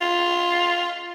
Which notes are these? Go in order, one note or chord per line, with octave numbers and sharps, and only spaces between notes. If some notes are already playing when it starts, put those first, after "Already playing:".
F4